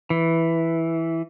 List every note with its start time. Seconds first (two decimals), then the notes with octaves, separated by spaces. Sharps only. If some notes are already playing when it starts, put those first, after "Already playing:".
0.10 E3